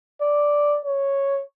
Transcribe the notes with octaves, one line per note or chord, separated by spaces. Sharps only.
D5
C#5